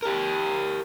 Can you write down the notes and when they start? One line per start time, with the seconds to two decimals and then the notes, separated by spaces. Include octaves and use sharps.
0.02 G4 A#4